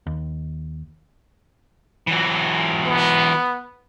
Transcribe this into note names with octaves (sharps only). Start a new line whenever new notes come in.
D#2
E3 F#3
B3